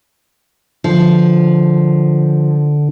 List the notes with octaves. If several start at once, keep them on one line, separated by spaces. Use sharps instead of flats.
D3 F3